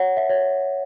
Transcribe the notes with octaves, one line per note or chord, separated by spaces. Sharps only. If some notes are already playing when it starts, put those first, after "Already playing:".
Already playing: C#5 F#5
E5
C#5